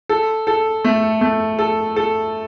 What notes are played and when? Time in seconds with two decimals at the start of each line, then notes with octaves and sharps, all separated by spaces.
0.09 A4
0.47 A4
0.85 A3
1.21 A3
1.59 A4
1.96 A4